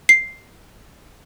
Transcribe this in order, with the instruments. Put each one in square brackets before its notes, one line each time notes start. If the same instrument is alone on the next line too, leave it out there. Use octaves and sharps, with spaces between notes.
[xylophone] C7